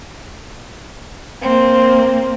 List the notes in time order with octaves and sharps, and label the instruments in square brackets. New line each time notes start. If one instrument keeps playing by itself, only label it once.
[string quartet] A#3 C4